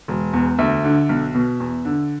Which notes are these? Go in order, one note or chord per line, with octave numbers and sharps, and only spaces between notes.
E1
E2
D2 E5
D3
B1
B2
E2
D3